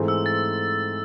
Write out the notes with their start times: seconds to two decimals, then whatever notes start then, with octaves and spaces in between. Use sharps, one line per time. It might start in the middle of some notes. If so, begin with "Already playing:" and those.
Already playing: G#2 E3 A3 C4 G#4
0.08 E6
0.26 A6